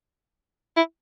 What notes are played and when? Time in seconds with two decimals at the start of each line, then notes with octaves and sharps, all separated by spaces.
0.77 E4